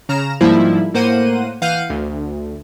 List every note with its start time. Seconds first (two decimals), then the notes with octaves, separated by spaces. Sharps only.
0.09 C#3 A#5 F6 A#6 E7
0.41 G#2 F3 G3 A#3 E4
0.94 A2 A#3 C5 F#5 D#7
1.62 E3 F5 F#5 F6 G6 D#7
1.90 D2